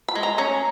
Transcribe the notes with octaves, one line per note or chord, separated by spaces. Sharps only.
B5
G#3
A#5
C#4 A#5